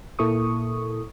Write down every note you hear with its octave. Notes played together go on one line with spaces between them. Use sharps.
A#2 A#3 E4 A4 C#6 D#6